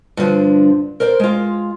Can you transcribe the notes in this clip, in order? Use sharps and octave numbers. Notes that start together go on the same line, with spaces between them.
G2 D3 F3 D4
A#4 C5 D5
G#3 F4